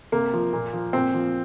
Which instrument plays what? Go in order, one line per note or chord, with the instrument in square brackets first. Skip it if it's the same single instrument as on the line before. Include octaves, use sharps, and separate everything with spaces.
[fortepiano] C3 A#3
F3
A#2
F3
A#2 C4
F3